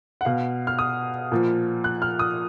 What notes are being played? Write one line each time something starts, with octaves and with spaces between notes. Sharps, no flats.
F#5
B2 F5
F6
D#6
A#2 F3
F#6
F6
D#6